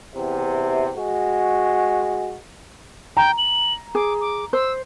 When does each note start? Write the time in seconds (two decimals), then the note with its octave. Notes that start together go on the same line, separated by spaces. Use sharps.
0.15 E2 C3
0.97 G#3 F#4
3.17 G5 A#5
3.38 F#7
3.95 G#4 D6
4.21 D6
4.53 C5 E6